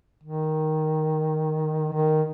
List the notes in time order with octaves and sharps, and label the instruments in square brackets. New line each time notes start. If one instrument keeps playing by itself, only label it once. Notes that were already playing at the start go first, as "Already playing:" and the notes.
[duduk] D#3
D#3